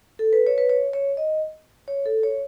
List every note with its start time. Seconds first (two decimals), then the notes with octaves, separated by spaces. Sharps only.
0.19 A4
0.33 B4
0.47 C#5
0.58 B4
0.70 C#5
0.94 C#5
1.17 D#5
1.88 C#5
2.06 A4
2.23 C#5